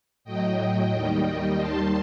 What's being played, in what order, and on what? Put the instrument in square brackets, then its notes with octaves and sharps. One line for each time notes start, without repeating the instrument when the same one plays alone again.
[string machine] A2 F#3 D#5 G5
D#2 D#3 G3
D#2 D#3 G3 A5 C6